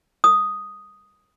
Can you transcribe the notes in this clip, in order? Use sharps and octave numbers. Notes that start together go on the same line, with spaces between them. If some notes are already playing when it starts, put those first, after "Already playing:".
D#6